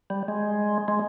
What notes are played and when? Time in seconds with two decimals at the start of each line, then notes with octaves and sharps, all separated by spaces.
0.10 G3
0.28 G#3
0.88 G#3